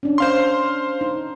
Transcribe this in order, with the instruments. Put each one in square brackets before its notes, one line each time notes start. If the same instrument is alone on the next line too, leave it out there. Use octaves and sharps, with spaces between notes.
[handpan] C#4 D4
[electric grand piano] C5 F5 C6
[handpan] D#4